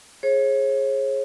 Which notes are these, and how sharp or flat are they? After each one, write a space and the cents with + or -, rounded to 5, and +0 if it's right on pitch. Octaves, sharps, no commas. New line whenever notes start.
G#4 +15 C#5 -40